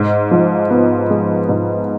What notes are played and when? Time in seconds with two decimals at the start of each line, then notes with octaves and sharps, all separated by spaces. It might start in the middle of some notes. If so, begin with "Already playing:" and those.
Already playing: G#2
0.31 F3
0.70 B3
1.10 G#3
1.49 G#2